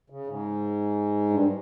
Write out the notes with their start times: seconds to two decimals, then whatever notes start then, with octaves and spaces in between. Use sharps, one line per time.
0.10 C#3
0.27 G#2
1.30 G2